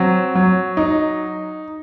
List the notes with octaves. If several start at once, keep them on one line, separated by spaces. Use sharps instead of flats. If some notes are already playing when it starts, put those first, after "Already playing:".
Already playing: F#3 C4
F#3
D#4